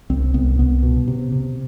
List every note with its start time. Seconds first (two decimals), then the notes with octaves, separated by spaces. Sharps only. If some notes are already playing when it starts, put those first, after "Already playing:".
0.10 C2 C4
0.34 C2 B3
0.59 C2 B3
0.83 B2
1.08 C3
1.32 C3